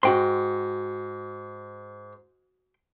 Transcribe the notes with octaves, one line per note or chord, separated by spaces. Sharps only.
G#2 F#4 G5 C6